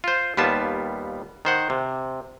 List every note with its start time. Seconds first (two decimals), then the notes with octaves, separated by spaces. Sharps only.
0.04 F4 C5
0.37 D#2 G3 B3 F4 A5
1.45 D#3 C5 F#5
1.70 C3